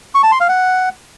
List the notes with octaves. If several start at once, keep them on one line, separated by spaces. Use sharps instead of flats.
C#6
A5
C6
F5
F#5